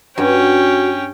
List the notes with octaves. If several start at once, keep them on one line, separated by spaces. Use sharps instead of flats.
G2 C#4 F#4 G5